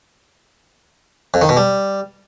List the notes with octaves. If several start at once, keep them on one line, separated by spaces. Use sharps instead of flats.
F2
D#3
B2
G3